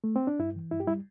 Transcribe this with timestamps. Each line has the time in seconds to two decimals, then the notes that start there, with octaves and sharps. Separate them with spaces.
0.04 A3
0.16 C4
0.27 D4
0.39 G2 E4
0.56 E3
0.71 G2 E4
0.80 G4
0.87 G3 E4